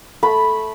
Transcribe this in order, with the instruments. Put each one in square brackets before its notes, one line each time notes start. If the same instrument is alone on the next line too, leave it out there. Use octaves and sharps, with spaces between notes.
[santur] A3 B5